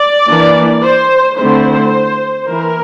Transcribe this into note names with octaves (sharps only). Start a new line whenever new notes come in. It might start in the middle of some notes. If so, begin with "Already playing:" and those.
Already playing: D5
E3 A#3 D4
C5
D3 A3 C4 E4 C5
E3 A#3 E4 A#4